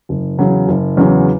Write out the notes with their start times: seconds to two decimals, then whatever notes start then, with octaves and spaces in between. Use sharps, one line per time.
0.09 F#1
0.38 E2 C#3 F#3
0.68 F#1
0.97 E2 C#3 F#3